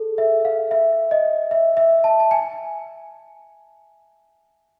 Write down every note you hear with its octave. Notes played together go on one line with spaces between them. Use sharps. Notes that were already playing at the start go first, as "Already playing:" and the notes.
Already playing: G#4 A4
E5
F5
E5
D#5
E5
E5
A5
A5
G#5